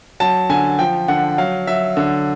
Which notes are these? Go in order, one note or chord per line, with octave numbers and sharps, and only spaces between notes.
F#3 A5
D3 G#5
F3 G5
D3 F#5
F#3 F5
F#3 E5
D3